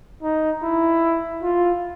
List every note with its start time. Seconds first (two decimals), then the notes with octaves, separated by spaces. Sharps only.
0.23 D#4
0.62 E4
1.42 F4